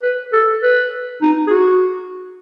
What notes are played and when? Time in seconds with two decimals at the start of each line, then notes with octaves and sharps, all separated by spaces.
0.03 B4
0.33 A4
0.63 B4
1.22 D#4
1.47 G#4
1.50 F#4